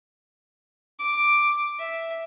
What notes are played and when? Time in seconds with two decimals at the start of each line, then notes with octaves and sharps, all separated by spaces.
0.99 D6
1.80 E5